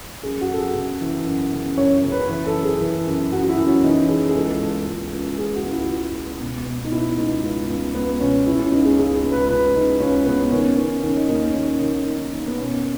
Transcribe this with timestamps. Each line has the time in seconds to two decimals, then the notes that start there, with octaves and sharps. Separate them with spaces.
0.23 F#2 G#4
0.41 F#4
0.49 F#2 A4
0.58 G#4
0.75 C#3
1.01 E3
1.26 F#2
1.52 C#3
1.77 F#2 C#5
2.04 C#3
2.12 B4
2.29 E3 B4
2.46 A4
2.54 F#2
2.63 G#4
2.81 E3
3.07 F#2
3.32 F#2 F#4
3.43 F#4
3.49 E4
3.57 F#2
3.67 C#4
3.84 E3 D#4
4.09 E3 G#4
4.29 G#4
4.35 C#2 A4
4.60 C#2 A4
4.87 C#2
5.13 C#2
5.38 C#2 G#4
5.55 F#4
5.64 C#2
5.73 E4
5.89 C#2
6.15 C#2
6.40 B2
6.66 B2
6.84 D#4
6.92 B2 E4
7.18 C#2 D#4
7.43 C#2
7.68 C#2
7.94 C#2 B3
8.20 B2 C#4
8.46 C#3 E4
8.59 C#4
8.72 C#2 D#4
8.85 G#4
8.98 C#2 G#4
9.15 G#4
9.23 C#2
9.32 B4
9.49 C#3 B4
9.74 C#3 D#4
10.00 C#2 C#4
10.26 C#3 B3
10.52 D#3 C#4
10.77 D#3 C#4
11.03 D#3 C#4
11.16 D#4
11.29 D#2 D#4
11.42 C#4
11.55 D#3
11.81 D#3
12.06 D#3
12.32 D#3
12.48 B3
12.58 B2 C#4